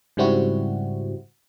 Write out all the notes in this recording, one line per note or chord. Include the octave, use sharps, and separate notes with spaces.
G#2 C#3 G3 C4 E4 F#4